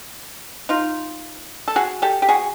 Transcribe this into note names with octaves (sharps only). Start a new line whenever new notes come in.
D#4 F4
A4
F#4 G#4
G4 A4
G4
F#4 G#4